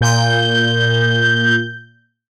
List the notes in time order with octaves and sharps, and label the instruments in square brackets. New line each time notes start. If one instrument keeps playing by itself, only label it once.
[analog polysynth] A#2 G6